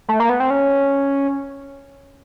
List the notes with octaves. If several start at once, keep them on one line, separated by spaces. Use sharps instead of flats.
A3
A#3
B3
C4
C#4